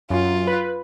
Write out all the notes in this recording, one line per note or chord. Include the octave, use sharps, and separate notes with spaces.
F#2 F4
B4